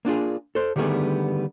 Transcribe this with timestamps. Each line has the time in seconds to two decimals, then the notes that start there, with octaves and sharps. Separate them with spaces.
0.05 A#3 D4 F4 G#4
0.55 A4 C5
0.76 D3 D#3 G3 A3 B3 G#4